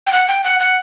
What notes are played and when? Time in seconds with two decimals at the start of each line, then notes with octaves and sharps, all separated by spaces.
0.07 G5
0.12 F#5
0.28 G5
0.44 F#5
0.60 F#5